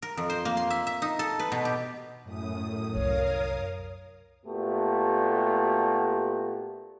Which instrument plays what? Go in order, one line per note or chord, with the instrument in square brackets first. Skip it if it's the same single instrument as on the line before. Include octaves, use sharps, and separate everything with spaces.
[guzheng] A#4
F2
C5
A#3
C6
E5
E5
D#4
A4
B4
B2
G4
[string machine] F#2 A2 D#6
[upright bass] C2 F#2 [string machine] A#4 F5 D#6 [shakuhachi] C#5
[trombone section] A#2 A3 B3 F#4 G4